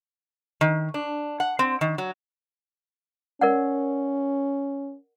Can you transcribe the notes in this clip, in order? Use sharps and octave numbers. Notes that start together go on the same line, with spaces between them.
D#3
D4
F#5
C4
D#3
F#3
C#4 A#4 D5 F#5